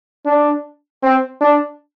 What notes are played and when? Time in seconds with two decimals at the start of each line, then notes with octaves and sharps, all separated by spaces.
0.26 D4
1.03 C4
1.41 D4